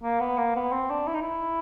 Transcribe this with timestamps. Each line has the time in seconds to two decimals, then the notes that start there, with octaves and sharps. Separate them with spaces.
0.03 A#3
0.20 B3
0.37 A#3
0.56 B3
0.72 C4
0.90 D4
1.07 E4
1.14 D#4
1.21 E4